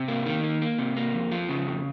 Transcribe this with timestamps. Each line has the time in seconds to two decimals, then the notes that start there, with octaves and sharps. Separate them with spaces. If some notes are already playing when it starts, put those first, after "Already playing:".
Already playing: C3
0.08 A#3
0.26 D#3
0.44 A#3
0.62 A#3
0.79 C3
0.97 A#3
1.14 F2
1.32 F3
1.49 C#3
1.67 F2